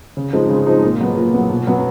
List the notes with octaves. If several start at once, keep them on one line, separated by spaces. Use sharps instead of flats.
C#3
F3 G#3 C4 D#4
C#3
F3 G#3 C4 D#4
A#2
F#3 B3
A#2
F#3 B3
B2
F#3 B3